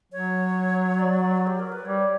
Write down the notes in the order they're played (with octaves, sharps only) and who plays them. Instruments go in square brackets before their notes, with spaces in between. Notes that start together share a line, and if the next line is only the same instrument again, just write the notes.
[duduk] F#3 [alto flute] C#5
[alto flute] D5
G4
A#4
B4
[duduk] G3 [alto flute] C#5